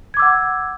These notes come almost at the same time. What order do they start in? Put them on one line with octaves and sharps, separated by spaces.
G#6 D6 E6 F#5